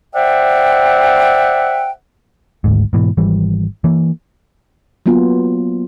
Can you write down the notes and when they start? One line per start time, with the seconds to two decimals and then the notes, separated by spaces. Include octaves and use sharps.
0.14 C5 D5 E5 F#5 G5
2.64 G#1 D2 G#2
2.93 G#2 B2 E3
3.17 G#1 E3 G3
3.84 E3 A#3
5.06 F#3 A#3 B3 F4